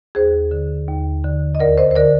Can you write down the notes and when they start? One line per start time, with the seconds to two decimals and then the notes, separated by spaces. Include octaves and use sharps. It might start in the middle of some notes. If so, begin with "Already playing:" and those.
0.15 D#2 G#4 C5
0.51 D3
0.88 D#2
1.24 D3
1.55 D#5
1.60 D2 A#4 D5
1.78 C5 D#5
1.91 C5
1.96 D3 A#4 D5